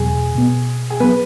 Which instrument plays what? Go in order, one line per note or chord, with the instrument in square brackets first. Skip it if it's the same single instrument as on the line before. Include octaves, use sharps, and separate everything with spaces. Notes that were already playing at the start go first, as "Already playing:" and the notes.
Already playing: [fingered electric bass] E2 B2 F#3 B3 [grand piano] G#4
[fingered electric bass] B2 B3
[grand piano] G#4
[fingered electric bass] F#3 B3 [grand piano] B4